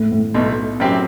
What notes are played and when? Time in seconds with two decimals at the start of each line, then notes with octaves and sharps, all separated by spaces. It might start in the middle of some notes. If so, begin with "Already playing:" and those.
Already playing: A2
0.12 A2
0.34 B1 B2 A3
0.80 F#1 F#2 F#3 C4 G4